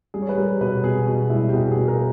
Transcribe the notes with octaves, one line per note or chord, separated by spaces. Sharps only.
G3 G#4
C#5
B4
G3 A#4
B2 B4
B2 G#4
B2
G3 E4
G4
B2 G#4
G#4
B2
A#4